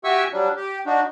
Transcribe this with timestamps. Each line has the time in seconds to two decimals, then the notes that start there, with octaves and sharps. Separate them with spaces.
0.04 F#4 G4 E5 G#5 C#6 E6
0.33 F#3 G3 D4
0.56 G4
0.86 D4 D#4 F#4